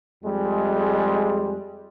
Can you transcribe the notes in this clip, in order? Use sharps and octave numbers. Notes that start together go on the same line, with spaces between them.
F2 G3 G#3